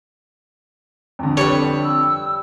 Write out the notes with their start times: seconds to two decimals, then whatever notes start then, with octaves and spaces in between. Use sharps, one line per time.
1.19 F2 D3
1.37 G3 A4 B4 C#5
1.82 E6